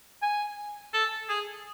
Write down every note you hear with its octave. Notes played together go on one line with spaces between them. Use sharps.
G#5
A4
G#4